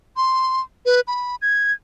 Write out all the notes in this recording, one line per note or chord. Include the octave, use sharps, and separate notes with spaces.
C6
B4
B5
G#6